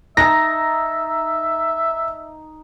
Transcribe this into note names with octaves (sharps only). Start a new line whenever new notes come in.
D#4 E5 A5 A#6